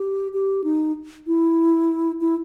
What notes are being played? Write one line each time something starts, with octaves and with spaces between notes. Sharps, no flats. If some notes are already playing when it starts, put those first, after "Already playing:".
Already playing: G4
G4
D#4
E4
E4